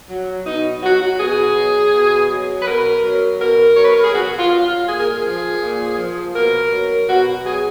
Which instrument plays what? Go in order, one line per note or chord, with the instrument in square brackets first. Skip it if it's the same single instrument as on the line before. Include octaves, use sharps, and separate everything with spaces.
[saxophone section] F#3
B2 D#4
F#3 F#4
F#4
B2 G#4
F#3
B2
F#3
B4
B2 A#4
F#3
B2 A#4
F#3 C#5
B4
A#4
G#4
B2 F#4
F4
F#3
F4
A#2 G#4
A#4
G#4
F3
A#2
F3
B2 A#4
F#3
B2 F#4
F#3 G#4